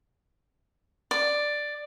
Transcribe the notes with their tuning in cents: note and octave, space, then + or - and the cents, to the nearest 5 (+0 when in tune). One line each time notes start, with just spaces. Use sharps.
D5 +5